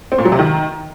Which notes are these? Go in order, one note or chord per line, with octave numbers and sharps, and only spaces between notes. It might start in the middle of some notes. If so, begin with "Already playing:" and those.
C4
A#2
F#3
C3
D#3